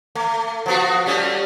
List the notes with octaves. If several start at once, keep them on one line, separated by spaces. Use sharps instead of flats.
A3
F3 B3 F#4
G3 A3 C#4